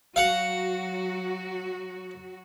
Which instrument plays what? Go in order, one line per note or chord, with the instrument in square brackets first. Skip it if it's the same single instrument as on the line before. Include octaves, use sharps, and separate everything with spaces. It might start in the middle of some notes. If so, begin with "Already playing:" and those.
[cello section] F#3 F#4 [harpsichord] F5 F#5